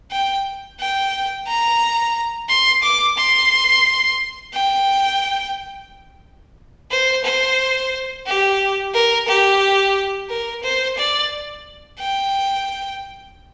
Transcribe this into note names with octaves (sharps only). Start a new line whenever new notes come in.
G5
G5
A#5
C6
D6
C6
G5
C5
C5
G4
A#4
G4
A#4
C5
D5
G5